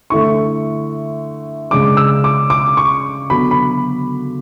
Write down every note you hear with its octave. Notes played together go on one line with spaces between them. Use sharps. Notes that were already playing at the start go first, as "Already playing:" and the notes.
D3 A3 E4 C#6
C#3 G#3 D4 D6
E6
D6
D6
C#6
D3 F#3 B3 F#4 B5
B5